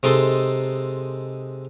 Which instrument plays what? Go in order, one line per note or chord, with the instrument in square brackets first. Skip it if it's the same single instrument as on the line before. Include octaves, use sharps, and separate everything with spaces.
[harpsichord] C3 G#3 D#4 A4 C6